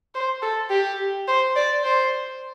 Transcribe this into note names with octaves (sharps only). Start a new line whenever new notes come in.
C5
A4
G4
C5
D5
C5